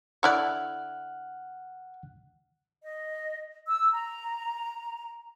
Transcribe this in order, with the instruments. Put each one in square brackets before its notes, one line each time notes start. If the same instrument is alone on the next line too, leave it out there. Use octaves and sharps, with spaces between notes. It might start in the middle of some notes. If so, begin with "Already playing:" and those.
[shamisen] D3 E4 D5 [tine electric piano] F#5 F6 F#6
[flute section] D#5
E6
A#5